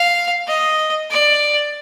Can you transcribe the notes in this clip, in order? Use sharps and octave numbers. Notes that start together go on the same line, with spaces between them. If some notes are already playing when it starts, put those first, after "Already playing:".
Already playing: F5
D#5
D5